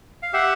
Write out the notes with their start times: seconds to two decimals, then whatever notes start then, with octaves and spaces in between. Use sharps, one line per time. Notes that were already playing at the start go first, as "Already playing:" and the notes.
0.23 F5
0.33 G4 E5 F#5